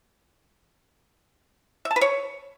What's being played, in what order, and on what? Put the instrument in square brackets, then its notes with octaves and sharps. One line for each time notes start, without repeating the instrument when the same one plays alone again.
[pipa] E5
A5
B4
C#5